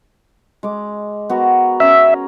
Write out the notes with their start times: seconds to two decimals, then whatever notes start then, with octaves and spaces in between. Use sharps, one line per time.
0.63 G#3 D6
1.29 B3 F#4 A#4
1.80 C#4 G#4 A#4 E5